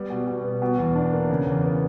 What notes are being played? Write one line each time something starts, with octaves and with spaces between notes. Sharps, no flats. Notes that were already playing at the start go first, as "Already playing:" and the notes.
Already playing: G3 B3
B2
B2
B3
B2
E2
D4
A#3
C#3
E2
B3